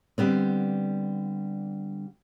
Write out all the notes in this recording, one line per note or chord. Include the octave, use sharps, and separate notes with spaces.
D3 G3 B3 C4